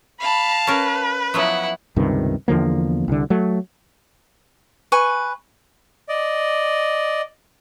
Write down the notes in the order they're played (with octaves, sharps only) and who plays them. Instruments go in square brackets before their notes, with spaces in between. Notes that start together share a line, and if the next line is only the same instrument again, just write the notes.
[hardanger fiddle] F5 A5 [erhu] B5
[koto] C#4 A#4 [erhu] B4
[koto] F3 F#3 B3 [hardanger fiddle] E4 F#5
[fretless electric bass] C#2 G2 C3 D#3
E2 D3 F3 A#3
C2 D3
F#3 A3
[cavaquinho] B4 G#5 C#6
[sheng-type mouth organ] D5 D#5